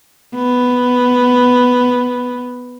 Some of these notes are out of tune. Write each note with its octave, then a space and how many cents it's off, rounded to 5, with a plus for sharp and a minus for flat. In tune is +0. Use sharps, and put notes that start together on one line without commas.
B3 +5